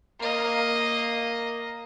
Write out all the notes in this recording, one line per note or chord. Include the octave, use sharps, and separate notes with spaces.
A#3 D#5